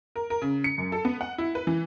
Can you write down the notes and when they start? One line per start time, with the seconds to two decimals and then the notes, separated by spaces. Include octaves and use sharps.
0.16 A#4
0.30 A#4
0.42 C#3
0.64 C#7
0.78 F#2
0.92 A4
1.05 B3
1.21 F#5
1.38 E4
1.55 B4
1.67 E3